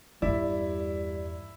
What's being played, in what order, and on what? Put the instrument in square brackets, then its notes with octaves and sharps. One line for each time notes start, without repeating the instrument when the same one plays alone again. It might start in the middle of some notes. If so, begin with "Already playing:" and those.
[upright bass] E2 G2 [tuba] G3 [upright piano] E4 [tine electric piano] D5